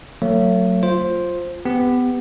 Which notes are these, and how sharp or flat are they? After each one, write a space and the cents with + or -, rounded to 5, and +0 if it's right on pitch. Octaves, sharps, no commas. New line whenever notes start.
F#3 +0 A3 +40 C#5 +0
F4 +0 C5 +5
B3 +20 G4 +25